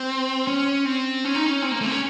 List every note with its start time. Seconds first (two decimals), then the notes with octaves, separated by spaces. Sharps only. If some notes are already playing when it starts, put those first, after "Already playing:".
Already playing: C4
0.47 C#4
0.85 C4
1.24 C#4
1.35 D#4
1.46 C#4
1.62 C4
1.71 A#3
1.81 A3
1.86 C4
1.91 C#4